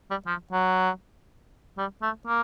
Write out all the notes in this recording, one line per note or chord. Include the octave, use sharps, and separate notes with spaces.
G3
F3
F#3
G3
A3
A#3